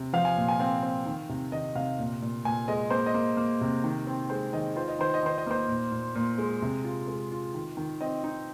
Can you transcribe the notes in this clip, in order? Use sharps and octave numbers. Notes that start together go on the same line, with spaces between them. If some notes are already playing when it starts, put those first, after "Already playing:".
Already playing: C3
F3 F5
G#5
A#2
G#5
C4 F5
C4
D#3
C3
D#3 D#5
C3 F5
A#2
A#2
A#2 G#5
G#3 D#5
A#3 C5
D#5
A#3
A#3
C3
D#3
C4
G#3 C5
D#3 D#5
F4 C5
D#5
D#3 C5
D#5
D#3 C5
D#5
A#3 C5
A#2
A#2
A#2
G#3
C3
F4
G#3
F4
D#3
D#3
C4 D#5
D#4